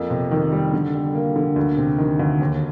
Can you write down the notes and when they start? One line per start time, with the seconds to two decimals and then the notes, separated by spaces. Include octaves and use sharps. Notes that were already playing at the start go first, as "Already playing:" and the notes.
Already playing: F2 A#3
0.10 C3
0.31 D#3
0.52 G3
0.73 D3
0.94 G3
1.15 A#3
1.36 D3
1.56 D2
1.77 C3
1.98 D#3
2.19 D2
2.40 D#2